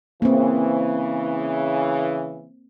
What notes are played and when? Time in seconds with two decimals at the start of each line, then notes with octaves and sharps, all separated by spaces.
0.22 C#3 E3 A#3 C4